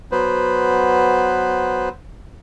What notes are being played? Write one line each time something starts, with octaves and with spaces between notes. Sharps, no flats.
F#3 B3 B4 C5